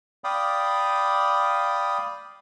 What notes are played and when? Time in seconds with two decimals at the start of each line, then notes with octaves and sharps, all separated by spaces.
0.24 D5 F5 G5 B5 D#6